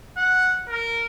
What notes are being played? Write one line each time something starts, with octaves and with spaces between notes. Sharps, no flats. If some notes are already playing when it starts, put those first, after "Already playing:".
F#5
A#4